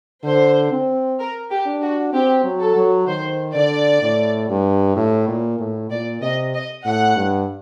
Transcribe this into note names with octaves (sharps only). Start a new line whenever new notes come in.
D3 C5
C4
A#4
G4
D4
F#4
C4 G4
F#3
A4
F#3
D#3 C5
D3 D5
A2
G2
A2
A#2
A2
A#2 D5
C3 D#5
D#5
A2 F#5
G2